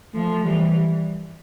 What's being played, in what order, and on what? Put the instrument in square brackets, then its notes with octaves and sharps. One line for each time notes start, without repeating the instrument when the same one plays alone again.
[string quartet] F3 [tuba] A3
[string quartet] E3 [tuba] G3